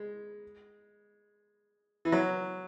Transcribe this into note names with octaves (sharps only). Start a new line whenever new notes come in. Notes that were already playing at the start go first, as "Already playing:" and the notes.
Already playing: G#3
E3
F#3